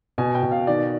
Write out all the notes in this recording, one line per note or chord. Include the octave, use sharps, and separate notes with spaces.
B2 G#5
G5
B2
F5
D#3 D5